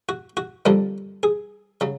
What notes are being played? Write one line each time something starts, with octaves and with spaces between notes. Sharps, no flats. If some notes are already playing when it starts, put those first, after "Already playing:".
F#4
F#4
F2 D3 G3 A#3
G#4
C#3 F#3